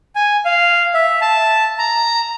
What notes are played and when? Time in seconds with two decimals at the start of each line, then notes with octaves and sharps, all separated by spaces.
0.15 G#5
0.45 F5
0.94 E5
1.21 A5
1.79 A#5